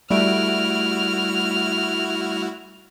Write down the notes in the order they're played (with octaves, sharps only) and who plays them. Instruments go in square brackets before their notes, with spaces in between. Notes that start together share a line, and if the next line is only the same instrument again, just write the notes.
[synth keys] G3 A3 D7 [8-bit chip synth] E4 F#4 [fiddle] F6